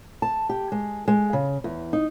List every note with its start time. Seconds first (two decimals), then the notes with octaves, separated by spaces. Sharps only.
0.22 A5
0.49 G4
0.72 G#3
1.08 G#3
1.33 C#3
1.64 E2
1.93 D#4